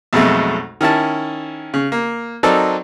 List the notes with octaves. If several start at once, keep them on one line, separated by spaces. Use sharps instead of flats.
B1 F2 B2 G#3 A3
D#3 C#4 E4 A5
C#3
A#3
F#3 C4 D#4 A4 A#4 D5